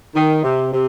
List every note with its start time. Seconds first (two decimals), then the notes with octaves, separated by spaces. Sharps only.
0.15 D#3
0.43 C3
0.73 C3